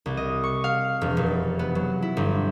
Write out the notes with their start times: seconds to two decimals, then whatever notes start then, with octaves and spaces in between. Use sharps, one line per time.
0.06 C2
0.17 D#5
0.44 C#6
0.64 F5
1.01 E1
1.17 F1
1.59 B3
1.75 F#3
2.02 E4
2.17 G1